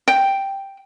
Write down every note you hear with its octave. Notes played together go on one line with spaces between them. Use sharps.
G5